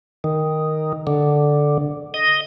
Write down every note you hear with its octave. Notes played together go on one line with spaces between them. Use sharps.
D#3
D3
D#5